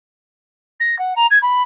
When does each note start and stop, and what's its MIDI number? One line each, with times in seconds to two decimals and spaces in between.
0.80 0.98 94
0.98 1.13 78
1.16 1.26 82
1.30 1.38 92
1.42 1.62 83